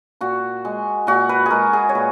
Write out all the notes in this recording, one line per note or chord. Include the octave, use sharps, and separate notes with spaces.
A#2 F#4
G#3
A#2 F#4
B4
G#3 G#4 A#4
G#4
C#5
A#2 B4